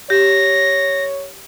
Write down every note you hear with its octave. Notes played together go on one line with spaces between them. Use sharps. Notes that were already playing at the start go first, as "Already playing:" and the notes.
G4 C#5 A#6